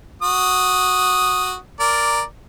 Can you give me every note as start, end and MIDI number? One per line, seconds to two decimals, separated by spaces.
0.22 1.55 66
0.22 1.55 87
1.80 2.22 70
1.80 2.22 74